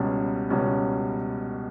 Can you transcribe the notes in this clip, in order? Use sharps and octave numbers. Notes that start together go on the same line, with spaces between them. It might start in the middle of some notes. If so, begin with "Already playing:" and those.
Already playing: C#2 B2 G3 C#4
C#2 B2 G3 C#4